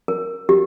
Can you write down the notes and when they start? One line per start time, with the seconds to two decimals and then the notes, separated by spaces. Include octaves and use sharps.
0.08 A#4
0.49 G4